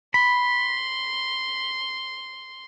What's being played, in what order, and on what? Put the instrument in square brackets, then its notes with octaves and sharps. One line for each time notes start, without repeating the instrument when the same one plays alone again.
[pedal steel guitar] B5 [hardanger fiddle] C6